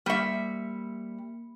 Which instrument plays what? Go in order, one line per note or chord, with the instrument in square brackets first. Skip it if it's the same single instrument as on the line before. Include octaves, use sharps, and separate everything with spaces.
[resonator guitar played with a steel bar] G3 E5 [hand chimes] A#3 B5 C#7